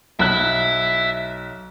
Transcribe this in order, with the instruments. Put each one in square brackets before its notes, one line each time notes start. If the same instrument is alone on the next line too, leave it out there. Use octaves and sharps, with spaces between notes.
[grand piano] B1 F#6 [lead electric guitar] E5 B5